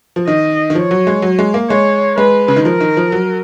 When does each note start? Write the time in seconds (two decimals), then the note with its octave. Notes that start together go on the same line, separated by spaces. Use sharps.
0.16 F3
0.28 D#3 D#5
0.70 D#3
0.75 F3 C#5
0.91 F#3
1.07 G#3
1.22 F#3
1.39 G#3
1.54 A#3
1.70 G#3 C#5
2.17 G#3 B4
2.48 C#3
2.56 D#3
2.65 F3 A#4
2.81 D#3
2.97 F3
3.12 F#3